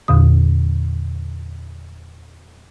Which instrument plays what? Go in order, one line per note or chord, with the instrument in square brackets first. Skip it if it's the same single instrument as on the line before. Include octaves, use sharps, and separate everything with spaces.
[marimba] E2 A#2 D3 D#6